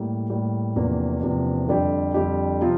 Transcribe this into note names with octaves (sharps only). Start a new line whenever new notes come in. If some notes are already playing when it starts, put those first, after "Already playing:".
Already playing: A2 G3 A#3
A2 G3 A#3
E2 C3 F3 A#3 D4
E2 C3 F3 A#3 D4
F2 D3 G3 D4 G4
F2 D3 G3 D4 G4
C3 F3 C4 F4